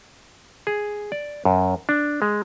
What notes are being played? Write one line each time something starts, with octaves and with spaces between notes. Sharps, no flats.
G#4
D5
F#2
D4
G#3